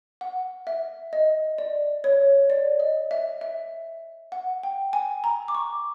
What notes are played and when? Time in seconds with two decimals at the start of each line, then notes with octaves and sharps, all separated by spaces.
0.21 F#5
0.67 E5
1.13 D#5
1.58 D5
2.04 C#5
2.50 D5
2.80 D#5
3.11 E5
3.41 E5
4.32 F#5
4.63 G5
4.93 G#5
5.24 A#5
5.48 D6
5.55 C#6